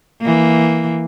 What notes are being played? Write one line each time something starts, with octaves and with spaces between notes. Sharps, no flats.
E3 A#3